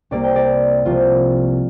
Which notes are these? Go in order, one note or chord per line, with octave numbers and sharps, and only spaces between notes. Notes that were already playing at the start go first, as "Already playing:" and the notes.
C2 C3 G3 A#3 D5
G5
D5
C2 C3 F3 A#3 F4